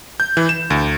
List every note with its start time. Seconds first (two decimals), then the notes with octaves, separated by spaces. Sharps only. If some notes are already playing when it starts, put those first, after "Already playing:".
0.20 G6
0.37 E3
0.49 E7
0.70 D2